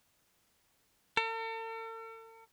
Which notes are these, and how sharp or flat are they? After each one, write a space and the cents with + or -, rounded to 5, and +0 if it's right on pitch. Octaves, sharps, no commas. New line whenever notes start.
A4 +45